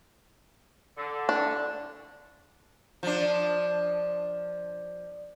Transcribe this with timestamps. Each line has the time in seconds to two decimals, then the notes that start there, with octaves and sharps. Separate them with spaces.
0.97 D3
1.29 D4
3.03 F3 D4